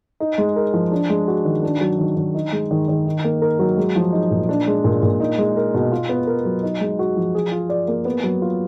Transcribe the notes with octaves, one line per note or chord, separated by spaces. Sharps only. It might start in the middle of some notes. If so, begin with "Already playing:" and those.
D#4
G#3
A#4
F3
D4
G#3
F#4
D#3
D4
F#3
D#3
D#3
D#4
G#3
D#3
D#3
D#4
A#3
A#4
F#3
G#3
F3
D#4
A#2
D4
G#3
A#2
A#2
D#4
G#3
A#4
B2
F4
B3
A#4
F#3
D#4
G#3
F#4
F3
G#4
F4
D5
A#3
B3
F#3
F4